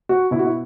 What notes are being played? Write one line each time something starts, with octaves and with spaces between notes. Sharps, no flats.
F#4
B2 E4
F#4
E4